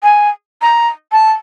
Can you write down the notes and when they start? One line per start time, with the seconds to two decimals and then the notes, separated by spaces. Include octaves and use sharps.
0.03 G#5
0.62 A#5
1.12 A5